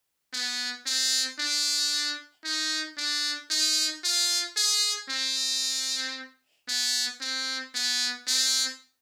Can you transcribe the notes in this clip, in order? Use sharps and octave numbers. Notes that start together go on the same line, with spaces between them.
B3
C4
D4
D#4
D4
D#4
F4
G#4
C4
B3
C4
B3
C4